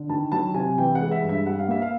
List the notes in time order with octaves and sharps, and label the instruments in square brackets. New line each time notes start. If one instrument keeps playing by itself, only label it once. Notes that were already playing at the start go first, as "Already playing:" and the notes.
Already playing: [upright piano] D3
D#3 A5
F#3 A5
C3 G#5
E3 G5
F#5
G#3
E5
G2
E5
G3 F#5
F5
A#3 E5
F5